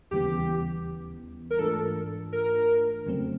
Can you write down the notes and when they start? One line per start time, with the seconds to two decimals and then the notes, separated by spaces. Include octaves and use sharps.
0.11 D#2 C#3 E3 G3 B3 G4
1.51 A#4
1.59 G#2 E3 A3 D4 F4 A4
2.33 A#4
3.06 F2 C#3 F#3 A3 C4